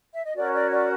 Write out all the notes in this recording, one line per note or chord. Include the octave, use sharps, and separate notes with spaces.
E5
D#5
C#4 F#4 A#4 C#5 D5
D5
C#5
D5